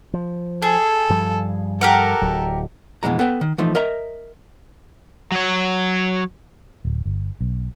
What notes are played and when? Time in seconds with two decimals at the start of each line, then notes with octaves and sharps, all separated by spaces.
0.14 F3
0.62 G#4 A4
1.10 G2 F3 G3
1.81 G4 A4 A#4 F#5
2.22 D1 F#3
3.03 F2 B2 E3 G#3 A#5
3.19 B3 A4 B4 G5
3.41 D#3
3.58 E3 F3 A3 D#4
3.75 A#4 D#5 E5 A#5
5.32 F#3 C#5
6.85 D1
7.05 G1
7.41 B1